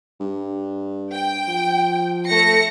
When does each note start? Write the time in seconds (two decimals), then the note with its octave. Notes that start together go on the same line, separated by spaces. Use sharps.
0.21 G2
1.13 G5
1.48 F3
2.28 A3 A#6 C#7